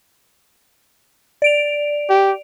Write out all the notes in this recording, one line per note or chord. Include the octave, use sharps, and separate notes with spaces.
D5 D7 F7
G4